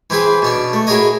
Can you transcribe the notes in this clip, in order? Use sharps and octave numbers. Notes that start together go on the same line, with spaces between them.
E3 C4 E4 G#4 B4
B2 C#4 D4
A3
E4 F#4 G#4 A#4 C#5 D#5